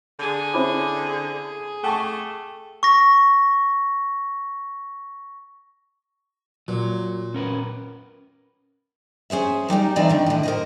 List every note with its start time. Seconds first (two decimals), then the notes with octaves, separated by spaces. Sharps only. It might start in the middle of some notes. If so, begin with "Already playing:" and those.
0.19 D3 G#4 G#5
0.54 C4 C#4 E4 C5 B5 D6
1.06 G#4
1.84 A3 F#5 G5 A5 C#6 D6
2.83 C#6 A#6
6.68 A#2 F#3
7.34 C#4 A#4 B4
9.30 C#4 G#4 C5 E5
9.69 F#3 G3 D#4 G4
9.96 E3 C4 D#4 G4 D5 D#5
10.09 D3 D#3
10.26 A2 D3
10.43 A#4 C5 D#5